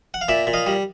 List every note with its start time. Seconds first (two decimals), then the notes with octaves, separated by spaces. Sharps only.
0.14 F#5
0.21 F5
0.28 A#2 D5 E5
0.47 A#2
0.53 D#5 F5
0.66 G3